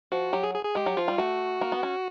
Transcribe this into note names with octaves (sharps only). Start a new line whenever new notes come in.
F3 F#4
F#3 G4
G#4
G#4
G#4
G#3 G4
F#3
F3 F4
G3
A3 F#4
A#3
B3
C#4